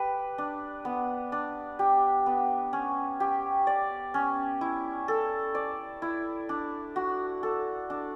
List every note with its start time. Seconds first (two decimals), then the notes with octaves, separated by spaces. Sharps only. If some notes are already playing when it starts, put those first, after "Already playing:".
Already playing: G4 B4
0.38 D4
0.85 B3
1.32 D4
1.79 G4
2.26 B3
2.73 C#4
3.20 G4
3.67 D5
4.14 C#4
4.61 E4
5.08 A4
5.55 D5
6.02 E4
6.49 D4
6.96 F#4
7.43 A4
7.90 D4